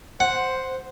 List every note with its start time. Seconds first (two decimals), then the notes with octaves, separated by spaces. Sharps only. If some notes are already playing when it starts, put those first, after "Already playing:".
0.20 C5 F#5